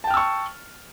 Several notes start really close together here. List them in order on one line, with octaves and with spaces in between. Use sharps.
A5 G5 F6 E6 C#6